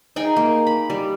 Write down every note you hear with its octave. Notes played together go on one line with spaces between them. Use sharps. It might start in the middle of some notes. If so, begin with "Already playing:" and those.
D#4 G#4 G5 G#5
A#3
B5
G3